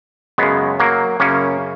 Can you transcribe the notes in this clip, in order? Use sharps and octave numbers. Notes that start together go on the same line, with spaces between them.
F#2 C#3 G#3 B3
F#3 A#3
F#2 C#3 A#3 C#4